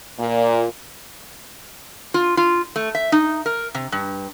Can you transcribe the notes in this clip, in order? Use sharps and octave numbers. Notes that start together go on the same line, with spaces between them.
A#2
F4
F4
A3
E5
D#4
A#4
C3
G2